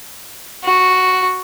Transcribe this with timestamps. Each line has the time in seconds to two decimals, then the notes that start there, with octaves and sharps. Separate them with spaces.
0.64 F#4